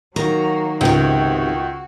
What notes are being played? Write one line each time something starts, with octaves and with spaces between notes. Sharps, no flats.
D#3 F#3 A#3 F#4 A#5
C#2 G#2 C3 F#4